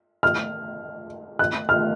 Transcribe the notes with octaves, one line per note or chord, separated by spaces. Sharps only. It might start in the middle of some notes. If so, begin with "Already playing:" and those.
F6
F#6
F6